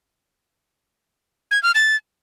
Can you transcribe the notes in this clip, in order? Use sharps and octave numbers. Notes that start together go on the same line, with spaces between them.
G#6
F6
A6